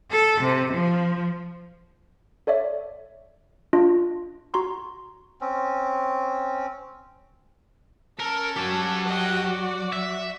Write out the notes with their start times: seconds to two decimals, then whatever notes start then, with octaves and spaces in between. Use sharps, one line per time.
0.11 A4
0.42 C3
0.74 F3
2.47 A4 C#5 D5 E5
3.73 D4 F4 D#5
4.54 F#4 A#5 C6 C#6
5.41 C4 C#4
8.19 C#4 A4 A#4
8.57 F#3 F#4 G4 A5
9.06 D#5 F#5 G5
9.48 D5
9.92 E5